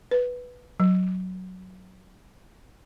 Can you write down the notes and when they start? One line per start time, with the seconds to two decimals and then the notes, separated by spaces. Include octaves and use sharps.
0.11 B4
0.80 F#3